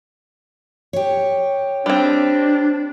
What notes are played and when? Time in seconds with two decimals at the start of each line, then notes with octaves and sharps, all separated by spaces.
0.93 G4 C#5
1.86 G3 C4 D4